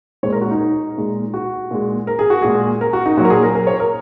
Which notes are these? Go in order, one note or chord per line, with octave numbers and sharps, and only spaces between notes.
A#2 G#3 C#5
A#4
F#4
D#4
A#2 G#3
F#4
A#2 G#3
A#4
G#4
F#4
A#2 G#3 G#4
A#4
F#4
D#4
A#2 F#3 F#4
A#4
G#4
A#4
A#4
C#5
A#4